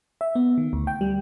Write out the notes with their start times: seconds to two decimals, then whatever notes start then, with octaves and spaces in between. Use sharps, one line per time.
0.21 E5
0.35 B3
0.58 D#3
0.73 D2
0.87 G5
1.01 G3